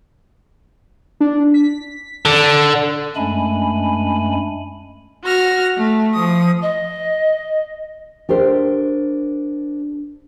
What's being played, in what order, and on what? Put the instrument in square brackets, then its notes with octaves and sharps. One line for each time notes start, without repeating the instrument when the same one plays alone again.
[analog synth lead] D4
B6
[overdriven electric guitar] D3
[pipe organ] F#2 G#3 A3 D4 G#5 B5
[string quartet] F#4 F6 A#6
A3
F3 D#6
[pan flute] D#5
[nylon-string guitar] D4 G4 A#4 C5